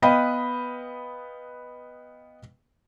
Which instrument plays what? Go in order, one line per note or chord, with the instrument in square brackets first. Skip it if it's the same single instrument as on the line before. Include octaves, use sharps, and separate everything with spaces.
[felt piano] B3 B4 D#5 F5 G5 B5